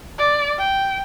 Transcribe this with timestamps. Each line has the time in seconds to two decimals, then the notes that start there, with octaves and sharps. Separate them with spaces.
0.18 D5
0.58 G5